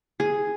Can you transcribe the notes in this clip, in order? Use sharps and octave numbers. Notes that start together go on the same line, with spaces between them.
G#4